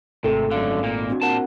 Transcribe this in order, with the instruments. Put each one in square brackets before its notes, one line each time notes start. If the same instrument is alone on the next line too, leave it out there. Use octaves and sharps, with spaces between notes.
[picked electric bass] G#1 [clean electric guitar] C3 [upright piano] A3
[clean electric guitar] F#2 D3 [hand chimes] F5
[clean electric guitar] A#2 A#3
[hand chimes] C4 D4 F#4
[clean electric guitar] A#2 A5 [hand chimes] C4 A#4 F#5